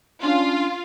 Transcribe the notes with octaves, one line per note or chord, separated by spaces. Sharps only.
C#4 D4 F4